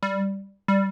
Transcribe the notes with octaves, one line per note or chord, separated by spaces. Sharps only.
G3
G3